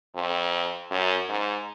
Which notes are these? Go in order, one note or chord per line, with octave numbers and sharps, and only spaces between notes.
F2
F#2
G#2